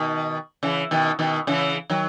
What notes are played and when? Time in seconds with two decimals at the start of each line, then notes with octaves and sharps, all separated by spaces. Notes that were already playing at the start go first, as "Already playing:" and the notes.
Already playing: B2 D#3
0.63 C#3 E3
0.91 B2 D#3
1.19 B2 D#3
1.47 C#3 E3
1.90 D#3 F#3